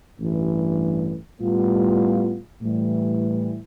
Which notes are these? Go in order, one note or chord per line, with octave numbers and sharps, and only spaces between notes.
A1 G2 E3
A2 G3 B3 F4
A2 E3 G3